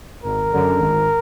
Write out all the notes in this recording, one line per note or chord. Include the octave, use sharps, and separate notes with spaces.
G#1 A#4
F#2 D3
G#1